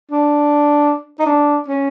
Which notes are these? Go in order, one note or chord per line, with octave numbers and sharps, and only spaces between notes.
D4
D#4
D4
C#4